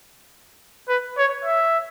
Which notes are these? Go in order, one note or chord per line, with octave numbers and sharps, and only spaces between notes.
B4
C#5
E5